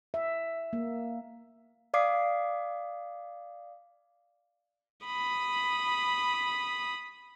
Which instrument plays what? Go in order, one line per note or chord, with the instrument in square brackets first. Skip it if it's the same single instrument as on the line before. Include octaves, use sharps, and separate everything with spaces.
[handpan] E5
A#3
[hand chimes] D5 F5 D6 D#6 C7
[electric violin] B5 D#6